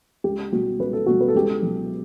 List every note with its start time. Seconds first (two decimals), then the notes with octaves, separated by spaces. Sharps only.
0.24 C#2 G4
0.52 B2 G3 F#4
0.79 C#2 B4
0.93 A4
1.06 B2 G3 F#4
1.21 B4
1.28 A4
1.35 C#2 G4
1.43 A4
1.62 B2 F#3